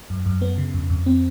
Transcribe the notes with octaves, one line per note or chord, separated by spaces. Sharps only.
F#2
F#2
B3
C#3
F2
F2
C4